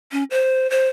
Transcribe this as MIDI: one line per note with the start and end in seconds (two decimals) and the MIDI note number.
0.12 0.24 61
0.31 0.69 72
0.70 0.88 72